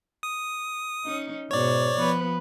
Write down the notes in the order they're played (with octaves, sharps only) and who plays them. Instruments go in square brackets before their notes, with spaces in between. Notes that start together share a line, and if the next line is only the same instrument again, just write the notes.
[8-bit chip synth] D#6
[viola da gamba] C#4 D#4
[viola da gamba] G#2 B2 [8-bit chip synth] C#5 D5
[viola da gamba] F3 B3 B4